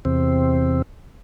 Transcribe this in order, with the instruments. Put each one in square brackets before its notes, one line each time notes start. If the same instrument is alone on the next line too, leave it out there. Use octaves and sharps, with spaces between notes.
[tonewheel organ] E2 C3 C4